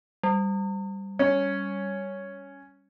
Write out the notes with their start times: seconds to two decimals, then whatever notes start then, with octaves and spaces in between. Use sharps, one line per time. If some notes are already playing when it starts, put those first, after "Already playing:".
0.23 G3
1.19 C#4